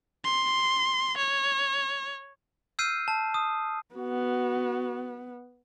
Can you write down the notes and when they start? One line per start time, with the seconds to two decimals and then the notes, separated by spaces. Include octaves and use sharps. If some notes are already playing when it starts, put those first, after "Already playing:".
0.24 C6
1.18 C#5
2.79 E6 F6 G6 C7 D#7
3.08 A5
3.34 D#6
3.95 B3 F#4